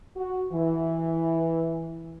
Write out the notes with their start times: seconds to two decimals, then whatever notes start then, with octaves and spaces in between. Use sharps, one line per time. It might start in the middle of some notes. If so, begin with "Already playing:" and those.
0.16 F#4
0.52 E3